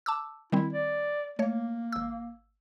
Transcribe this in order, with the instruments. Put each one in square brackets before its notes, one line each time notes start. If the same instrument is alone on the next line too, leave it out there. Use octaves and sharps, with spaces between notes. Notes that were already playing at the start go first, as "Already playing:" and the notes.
[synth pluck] A5 D6 E6
[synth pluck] D#3 G3 C4 [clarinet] E4
[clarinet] D5
[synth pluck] A3 C#5 [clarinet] A#3
[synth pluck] G#1 E6